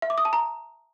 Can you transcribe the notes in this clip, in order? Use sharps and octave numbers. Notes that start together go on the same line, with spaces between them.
E5
D6
D#6
A5
A#5